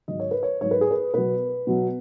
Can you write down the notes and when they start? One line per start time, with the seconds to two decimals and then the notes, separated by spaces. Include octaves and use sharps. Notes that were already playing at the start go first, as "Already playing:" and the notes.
0.08 G#2 D#3 F#3 D#5
0.20 C#5
0.31 B4
0.43 C#5
0.61 G#2 F#3 C#5
0.71 B4
0.81 G#4
0.91 B4
1.14 B2 F#3 B4
1.67 B2 F#3